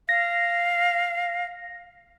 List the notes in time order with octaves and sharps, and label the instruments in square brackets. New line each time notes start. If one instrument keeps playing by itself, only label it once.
[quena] F5 [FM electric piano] A#6